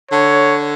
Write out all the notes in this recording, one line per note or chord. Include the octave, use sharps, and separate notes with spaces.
D3 C#5